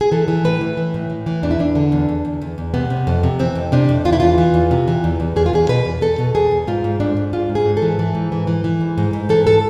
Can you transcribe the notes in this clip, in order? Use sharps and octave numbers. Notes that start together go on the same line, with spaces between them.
G#4
E3 A4
E3
A2 B4
E3
E3
A2
A2
E3
E2 D4
E4
E2 D4
D3
E2
E2
E2
E2
E2
C3 B3
C3
F2
C3
E3 C4
F2
C3 D4
F2
E2 F4
E4
E2 F4
E3
E2
C3
E3
E2
E2
E2 G#4
F4
E2 G#4
B2 B4
E2
E2 A4
B2
E2 G#4
E2
G#2 F4
G#2
G#2 D4
G#2
G#2 F4
G#2
G#4
G#2
A4
E3
E3
G#2
E3
E3
E3
G#2
G#2
G#2
E3 A4
A4